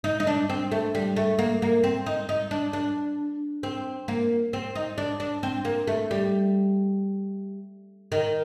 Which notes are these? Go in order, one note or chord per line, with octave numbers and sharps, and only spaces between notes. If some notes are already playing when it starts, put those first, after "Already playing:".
D#4
D#4
D4
C4
A3
G3
A3
A#3
A#3
C4
D#4
D#4
D4
D4
C4
A#3
C4
D#4
D4
D4
C4
A#3
A3
G3
D#3